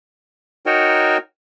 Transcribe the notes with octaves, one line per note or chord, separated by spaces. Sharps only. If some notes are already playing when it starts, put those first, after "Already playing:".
D#4 F#4 A#4 C#5 G5